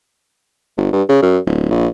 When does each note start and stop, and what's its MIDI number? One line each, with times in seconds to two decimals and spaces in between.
0.77 0.91 31
0.93 1.03 43
1.09 1.18 49
1.22 1.38 42
1.46 1.69 26
1.70 1.87 34